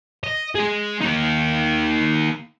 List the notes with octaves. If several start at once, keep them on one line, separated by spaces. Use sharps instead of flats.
D#5
G#3 G#4
A#3 D#4